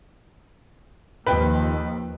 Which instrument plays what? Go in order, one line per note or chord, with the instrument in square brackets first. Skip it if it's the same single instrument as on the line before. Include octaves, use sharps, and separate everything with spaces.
[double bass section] D#2 D#3 F3 [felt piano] B4 G5